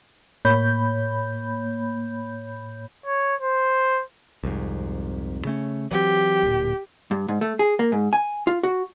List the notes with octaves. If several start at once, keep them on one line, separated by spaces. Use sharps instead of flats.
A2 A#3 C#5 B5 G6
C#5
C5
C2 F2 G#2
C#3 A3 C#4
E3 F#3 C4 G4
D1 A#2
G2
G#2
A3
G#4
A#3
G#2
G#5
F4
F#4